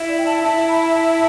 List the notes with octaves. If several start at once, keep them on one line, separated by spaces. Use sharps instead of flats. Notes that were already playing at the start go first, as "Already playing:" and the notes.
Already playing: E4
D5
G5
A5
E4 A5
B5
A5